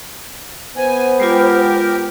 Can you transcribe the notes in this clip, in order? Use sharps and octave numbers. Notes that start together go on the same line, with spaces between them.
B3 C5 G#5
G#3 F4 G4 A#4